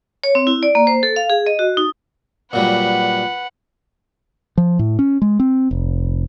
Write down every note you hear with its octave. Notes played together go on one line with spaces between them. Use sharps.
C#5
C4
E4
D5
A#3
C5
A4
F5
G#4
D#5
F#4
D#4
A#2 F#3 G3 B4 F#5
F3
A2
C#4
G#3
C4
F1